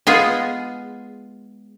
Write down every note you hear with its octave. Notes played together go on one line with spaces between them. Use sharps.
G#3 B3 F4 G#4